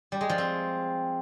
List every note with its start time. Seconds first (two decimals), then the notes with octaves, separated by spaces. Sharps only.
0.12 G3
0.21 G#3
0.29 F3
0.38 C4